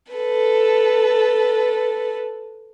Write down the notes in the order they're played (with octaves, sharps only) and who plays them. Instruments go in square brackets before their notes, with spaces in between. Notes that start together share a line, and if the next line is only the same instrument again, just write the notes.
[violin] A4 B4